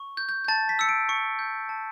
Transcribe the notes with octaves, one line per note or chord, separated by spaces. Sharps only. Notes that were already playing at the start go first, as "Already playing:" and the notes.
Already playing: C#6
G6
G6
G6
A5 A6
B6
E6 C#7
D7
C#6 C#7
G6
A5